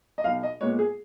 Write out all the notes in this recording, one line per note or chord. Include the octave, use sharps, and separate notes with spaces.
D#5
B1 F5
D#5
A#2 G#3 B3 C#5
G#4